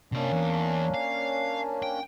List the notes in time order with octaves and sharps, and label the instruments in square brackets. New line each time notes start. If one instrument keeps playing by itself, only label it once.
[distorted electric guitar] C3 D#5 [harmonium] A#3 C#4 D4
[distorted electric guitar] E2
F5
G5